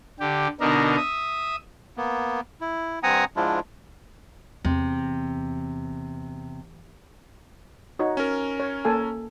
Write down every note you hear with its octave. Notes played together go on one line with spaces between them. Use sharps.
D3 G4
B2 D3 D4 D#4 A#4
E5 D#6
A#3 B3
E4
G2 C4 F#5 G#5 A#5 D#6
G#2 F3 G#3 D4 E4 F4
E2 C3
D#4 F#4 C#5
C#4 A#4
C#5
A#3 A4 G#5